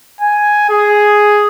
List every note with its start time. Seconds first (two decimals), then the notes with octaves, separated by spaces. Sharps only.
0.21 G#5
0.70 G#4